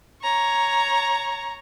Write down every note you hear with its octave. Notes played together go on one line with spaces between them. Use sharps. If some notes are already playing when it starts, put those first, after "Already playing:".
C#5 A#5